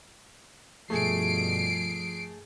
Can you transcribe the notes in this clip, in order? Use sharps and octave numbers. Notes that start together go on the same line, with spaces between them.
G2 B2 F3 A3 G#4 C7 D7